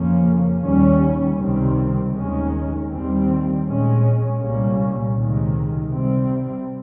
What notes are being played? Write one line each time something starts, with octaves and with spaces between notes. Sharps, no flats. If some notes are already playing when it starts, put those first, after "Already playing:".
Already playing: F2 C#3 F3 A#3 C#4
D#2 D#3 G3 C#4
C#2 C3 D#3 G3 C4
D#2 D#3 G#3 C#4
D#2 D#3 G3 C4
A#2 G#3 C#4
C2 A#2 G3 A#3 C#4
C#2 C3 D#3 G#3
C3 G3 C4